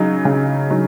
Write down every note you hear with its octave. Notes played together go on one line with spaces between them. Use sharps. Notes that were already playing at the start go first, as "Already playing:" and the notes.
Already playing: C#3 F#3 D#4
C#3
F#3 D#4